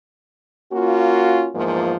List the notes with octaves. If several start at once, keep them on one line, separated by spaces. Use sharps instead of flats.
A#3 C#4 F4 F#4
E2 G#2 F3 A#3 F4